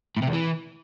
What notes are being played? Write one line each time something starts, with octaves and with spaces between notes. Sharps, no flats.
A2
C3
E2
E3